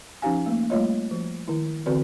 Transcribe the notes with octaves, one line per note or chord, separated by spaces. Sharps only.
F3 C#4 D#4 G4 F5 G#5
A3 A#3
G3 A3 A#3 F4 C#5 D#5
F3
D#3 E4
D3 E3 C4 F#4 B4 D5